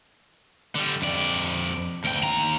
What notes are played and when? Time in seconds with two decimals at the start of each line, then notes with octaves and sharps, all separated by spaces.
0.76 D3 G3
1.02 F2 D5
2.04 D2 G5
2.23 D#2 A#5